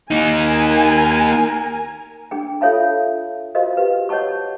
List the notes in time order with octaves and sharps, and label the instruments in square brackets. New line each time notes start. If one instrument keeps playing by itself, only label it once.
[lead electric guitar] A#3 D#4 [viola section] A#4 G#5
[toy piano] D4 G#4 G5
F4 A4 C#5 E5 F5 A5
F4 F#4 A#4 C5 D#5 F5
G4 B4 F5
C#5 D#5 F#5 A5 C#6